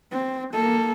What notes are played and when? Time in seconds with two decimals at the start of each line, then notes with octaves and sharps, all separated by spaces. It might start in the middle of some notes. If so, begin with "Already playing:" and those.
0.12 C4
0.53 A#3 A4